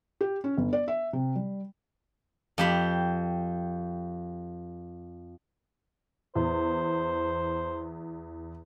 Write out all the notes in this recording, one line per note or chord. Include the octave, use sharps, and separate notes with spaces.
G4
C#4
G1
D5
E5
C3
G3
F2 G4 B5
E2 C5